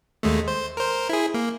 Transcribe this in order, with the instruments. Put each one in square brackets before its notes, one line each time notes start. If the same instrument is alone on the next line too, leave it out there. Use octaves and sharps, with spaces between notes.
[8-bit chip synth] D#2 G#3 A3
C5
A#4 C5
E4 G#4
A#3